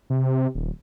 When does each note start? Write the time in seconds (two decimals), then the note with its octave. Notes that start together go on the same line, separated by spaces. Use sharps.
0.10 C3
0.55 D#1